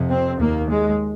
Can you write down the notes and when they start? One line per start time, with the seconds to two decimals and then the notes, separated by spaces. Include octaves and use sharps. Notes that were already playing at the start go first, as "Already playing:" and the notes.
Already playing: F2 C3
0.10 C4
0.39 D#2 A#3
0.70 G#3